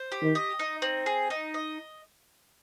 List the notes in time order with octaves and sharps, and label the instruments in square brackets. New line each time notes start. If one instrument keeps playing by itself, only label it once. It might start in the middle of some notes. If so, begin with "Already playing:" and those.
Already playing: [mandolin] C5
G4
[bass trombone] D#3
[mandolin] D#5
D#4
C4
G#4
D#4
D#5